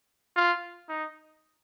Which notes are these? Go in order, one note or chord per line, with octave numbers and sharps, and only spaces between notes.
F4
D#4